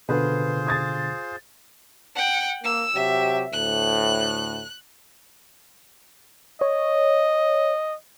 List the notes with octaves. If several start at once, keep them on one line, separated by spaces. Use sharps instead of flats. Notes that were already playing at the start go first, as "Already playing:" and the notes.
B2 D3 F4 G#4 B4 C5
D#6 G#6 A6
F#5 G5
A#3 E6
C3 F#3 G4 E5
D2 A2 F#6
C#5 D#5